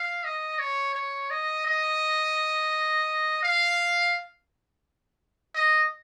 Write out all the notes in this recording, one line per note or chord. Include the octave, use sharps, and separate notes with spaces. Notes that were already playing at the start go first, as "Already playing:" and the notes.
Already playing: F5
D#5
C#5
C#5
D#5
D#5
F5
D#5